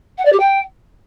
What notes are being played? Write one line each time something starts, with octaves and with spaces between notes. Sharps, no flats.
F#5
D5
G4
G5